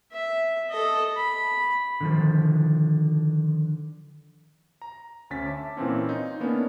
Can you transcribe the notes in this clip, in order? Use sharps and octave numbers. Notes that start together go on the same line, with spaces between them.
E5
A4 D#5
B5
D3 D#3 F3
A#5
D2 C#4 A6 B6
E5 A5 D6
A#2 E3 C4 C#4
D#4
A#3 B3 C#4 D4